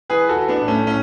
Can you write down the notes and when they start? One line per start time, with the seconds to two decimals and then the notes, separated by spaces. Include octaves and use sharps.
0.10 E3 G#4 B4
0.29 F#4 A4
0.36 E3
0.48 B3 D4
0.61 A2
0.68 A3 C#4
0.87 A2 C#4